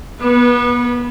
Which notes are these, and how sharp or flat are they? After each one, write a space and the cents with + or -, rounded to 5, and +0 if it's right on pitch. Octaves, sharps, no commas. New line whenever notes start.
B3 -30 B4 -10